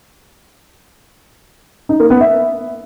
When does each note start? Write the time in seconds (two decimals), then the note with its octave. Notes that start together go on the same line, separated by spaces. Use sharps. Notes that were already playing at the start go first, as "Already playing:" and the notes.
1.89 D#4
2.00 A#3
2.10 B3
2.21 E5